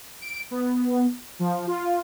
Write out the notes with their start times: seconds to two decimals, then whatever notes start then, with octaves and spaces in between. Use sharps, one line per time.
0.21 D7
0.51 B3
1.39 F3
1.67 F4